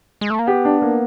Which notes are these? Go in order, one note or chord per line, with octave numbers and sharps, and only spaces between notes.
G#3
A3
A#3
B3 G4
D4
A#3